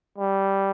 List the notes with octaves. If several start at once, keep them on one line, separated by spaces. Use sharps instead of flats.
G3